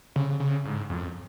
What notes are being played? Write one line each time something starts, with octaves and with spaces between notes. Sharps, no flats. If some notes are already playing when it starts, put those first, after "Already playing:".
C#3
C#3
G#2
F2